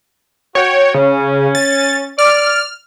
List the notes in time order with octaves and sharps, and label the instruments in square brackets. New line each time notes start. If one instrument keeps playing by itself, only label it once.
[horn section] F#4 G5 [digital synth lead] C#5
[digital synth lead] C#3 [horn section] C#4
[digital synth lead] A6
[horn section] D5 [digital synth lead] F6